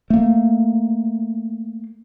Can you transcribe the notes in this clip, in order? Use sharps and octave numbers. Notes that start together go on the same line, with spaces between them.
A3 A#3